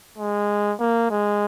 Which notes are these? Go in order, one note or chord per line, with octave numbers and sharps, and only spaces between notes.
G#3
A#3
G#3